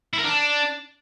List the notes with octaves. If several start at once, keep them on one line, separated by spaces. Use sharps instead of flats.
E4
A#4
D4